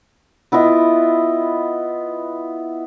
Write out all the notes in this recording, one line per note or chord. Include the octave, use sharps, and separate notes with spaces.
B3 E4 F4 D#5